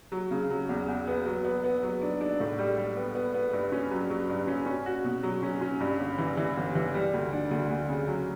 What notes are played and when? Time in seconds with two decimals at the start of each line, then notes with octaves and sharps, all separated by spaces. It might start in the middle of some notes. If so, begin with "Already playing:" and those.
0.12 F#3
0.31 C#3
0.50 F#3
0.69 E2
0.88 E2
1.07 B3
1.26 F#3
1.45 B3
1.64 B3
1.83 F#3
2.02 D4
2.21 D4
2.40 A2
2.58 G3
2.77 G3
2.96 B3
3.15 B3
3.34 B3
3.53 G2
3.72 C#4
3.91 F#3
4.10 F#3
4.29 G2
4.47 C#4
4.66 C#4
4.86 F#4
5.04 B2
5.23 F#3
5.42 C#4
5.61 C#4
5.80 G2
6.00 G1
6.18 E3
6.37 E3
6.57 G1
6.75 E3
6.94 G3
7.13 D2
7.32 D4
7.51 D2
7.70 D2
7.88 C#3
8.07 F#3